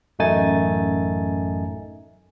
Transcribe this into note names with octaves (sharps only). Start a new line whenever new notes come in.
A1 F#2 A3 D#4 G#5 A6